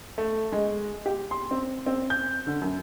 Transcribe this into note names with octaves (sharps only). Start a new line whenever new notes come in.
A3
G#3
G4
C6
C4
C4
G6
D3
F#2